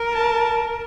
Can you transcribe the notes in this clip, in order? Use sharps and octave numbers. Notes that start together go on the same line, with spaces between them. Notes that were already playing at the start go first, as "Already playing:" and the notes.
Already playing: A#4
A5